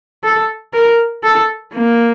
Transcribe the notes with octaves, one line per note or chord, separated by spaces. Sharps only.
A4
A#4
A4
A#3